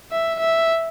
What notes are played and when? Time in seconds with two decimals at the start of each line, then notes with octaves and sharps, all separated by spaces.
0.12 E5
0.40 E5